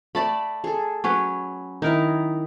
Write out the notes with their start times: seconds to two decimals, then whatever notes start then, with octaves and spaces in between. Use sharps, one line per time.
0.15 A3 D5 A5 B5
0.64 G#4 A4
1.04 F#3 C#4 B4
1.82 D#3 D#4 E4 A#4